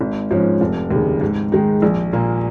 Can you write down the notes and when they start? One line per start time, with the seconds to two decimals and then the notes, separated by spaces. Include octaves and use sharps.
0.01 G#1
0.31 G#2 F3 C#4
0.61 F1
0.91 D#2 C#3
1.21 G#2
1.52 D#3 G#3 D#4
1.82 A#1
2.13 A#2 A#3